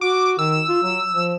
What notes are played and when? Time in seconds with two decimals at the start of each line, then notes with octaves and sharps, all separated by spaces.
0.01 F#4 D6
0.39 D#3 E6
0.69 F4
0.83 F#3
1.13 F3